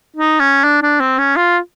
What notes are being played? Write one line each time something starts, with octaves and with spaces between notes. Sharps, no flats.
D#4
C#4
D4
D4
C4
C#4
F4